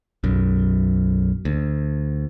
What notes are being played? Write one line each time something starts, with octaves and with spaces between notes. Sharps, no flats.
B1 F#2
D2